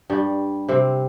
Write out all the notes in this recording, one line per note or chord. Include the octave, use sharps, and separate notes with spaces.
G2 G3
C3 C4